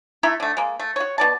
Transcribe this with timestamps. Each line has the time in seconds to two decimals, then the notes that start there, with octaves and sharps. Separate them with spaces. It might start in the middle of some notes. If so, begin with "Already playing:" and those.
0.23 A3 E4 E5 A#5
0.40 D3 A3
0.57 G#3 A#3
0.79 A3
0.96 F#4 C#5
1.18 B2 D5 A5